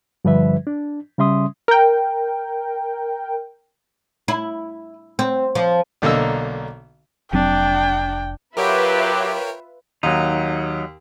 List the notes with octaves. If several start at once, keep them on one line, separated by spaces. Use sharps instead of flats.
G2 D3 F3 G3 B4 E5
D4
C#3 G3 C#4 E5 C6 D#6
A#4 G5
E4
C4
F3
B1 D3 A#3 D#5 E6
F1 F#3 C4 D4 G5
F#3 F4 G4 A#4 B4 C#5 E5 G5
D#2 F#3 D#4